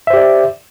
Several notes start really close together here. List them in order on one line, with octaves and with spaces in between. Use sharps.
E5 C5 G4 D5